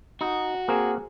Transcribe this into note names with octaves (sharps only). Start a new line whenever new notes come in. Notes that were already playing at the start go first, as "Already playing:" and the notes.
D#4 F#4
A#3 C4 G#4 A#4